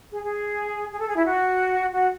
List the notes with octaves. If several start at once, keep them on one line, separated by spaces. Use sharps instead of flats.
G#4
G#4
G#4
A4
G#4
E4
F#4
F#4